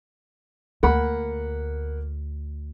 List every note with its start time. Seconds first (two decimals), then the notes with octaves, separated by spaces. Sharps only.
0.83 D2 A#3 F#5 B5